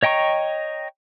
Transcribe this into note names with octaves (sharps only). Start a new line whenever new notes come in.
C#5 D#5 G5 A#5 C#6